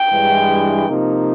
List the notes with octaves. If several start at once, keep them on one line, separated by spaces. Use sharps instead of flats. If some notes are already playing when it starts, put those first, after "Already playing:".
Already playing: G5
G2 E3 G#3
C3 F3 A#3 D#4